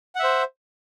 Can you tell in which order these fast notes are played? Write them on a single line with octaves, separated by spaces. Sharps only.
F#5 E5 C5